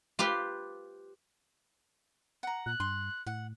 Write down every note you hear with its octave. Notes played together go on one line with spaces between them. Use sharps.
F4 G4 B4 C5
F#5 A#5
A#2 F#6
G2 C6
A2 F#5